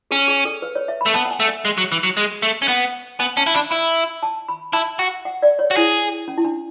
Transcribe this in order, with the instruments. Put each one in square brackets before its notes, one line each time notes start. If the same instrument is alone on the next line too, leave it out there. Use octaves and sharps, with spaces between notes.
[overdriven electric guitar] C#4 [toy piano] G#4
[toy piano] G#4
A4
B4
C#5
E5
B5
[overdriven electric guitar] A3
[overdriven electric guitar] B3 [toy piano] A5
[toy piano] F#5
G#5
[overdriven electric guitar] A3
[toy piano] E5
[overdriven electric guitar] G#3
F#3
E3
F#3
G#3
A3
C#4
[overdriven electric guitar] B3 [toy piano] F#5
[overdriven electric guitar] B3 [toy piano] G#5
[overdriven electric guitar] C#4 [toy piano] A5
[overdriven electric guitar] E4
[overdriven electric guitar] D4 [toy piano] B5
[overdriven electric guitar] E4 [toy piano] B5
[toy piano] A5
B5
[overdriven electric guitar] E4 [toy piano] A5
[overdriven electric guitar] F#4
[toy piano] F#5
D5
C#5
[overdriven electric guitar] F#4
[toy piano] E4 [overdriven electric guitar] G#4
[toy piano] C#4
E4
D4